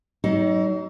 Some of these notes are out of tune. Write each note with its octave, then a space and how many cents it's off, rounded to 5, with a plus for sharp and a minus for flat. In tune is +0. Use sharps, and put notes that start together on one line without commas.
F#3 +40 D#4 +10